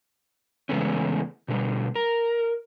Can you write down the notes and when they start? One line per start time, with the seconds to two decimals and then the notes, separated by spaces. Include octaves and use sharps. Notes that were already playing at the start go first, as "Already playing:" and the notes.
0.69 C#3 E3 G#3 A3 B3 C#4
1.48 B2 D3 E3 G3
1.95 A#4